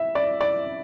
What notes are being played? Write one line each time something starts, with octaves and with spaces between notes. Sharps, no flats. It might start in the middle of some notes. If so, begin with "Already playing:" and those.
Already playing: E5
D5
D5